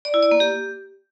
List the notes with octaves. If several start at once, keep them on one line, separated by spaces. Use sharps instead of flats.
D5
E4
D5
A#3
G4